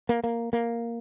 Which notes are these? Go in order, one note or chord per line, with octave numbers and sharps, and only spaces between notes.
A#3
A#3
A#3